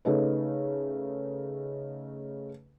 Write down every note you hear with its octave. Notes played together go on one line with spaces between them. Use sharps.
C#3 A3 D#4 B4